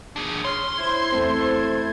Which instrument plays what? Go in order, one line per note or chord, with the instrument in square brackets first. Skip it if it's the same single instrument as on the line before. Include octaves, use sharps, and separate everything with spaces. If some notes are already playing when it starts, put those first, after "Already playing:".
[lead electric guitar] D4 G#4
[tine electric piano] C#5 F6 [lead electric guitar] C6
[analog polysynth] E4 C5 G#6
[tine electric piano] E2 A3 C4 [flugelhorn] A4